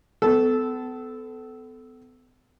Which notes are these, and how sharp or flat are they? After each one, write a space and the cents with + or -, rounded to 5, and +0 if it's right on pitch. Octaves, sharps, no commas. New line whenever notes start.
B3 +40 A4 -10